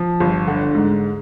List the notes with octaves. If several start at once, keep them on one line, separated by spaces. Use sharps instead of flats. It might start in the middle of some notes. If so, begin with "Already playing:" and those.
Already playing: F3
G1
D3
G#2